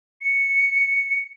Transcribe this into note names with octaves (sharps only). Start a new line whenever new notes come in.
C#7